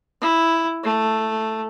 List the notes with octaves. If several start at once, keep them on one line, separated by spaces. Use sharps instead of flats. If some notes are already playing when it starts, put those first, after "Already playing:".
E4
A3